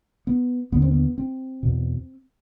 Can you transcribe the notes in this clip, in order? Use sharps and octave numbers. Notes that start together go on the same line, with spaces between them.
B3
D#2 D3 B3
C4
B3
C4
E2 B2